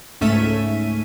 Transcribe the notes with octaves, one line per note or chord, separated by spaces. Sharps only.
C#2 G#2 A3 C#4 E5 D#7